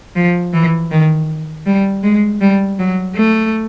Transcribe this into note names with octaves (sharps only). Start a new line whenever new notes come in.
F3
E3
D#3
G3
G#3
G3
F#3
A3